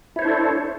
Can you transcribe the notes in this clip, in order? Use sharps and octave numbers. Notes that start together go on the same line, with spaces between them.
D4 E4 A4 C5 C#5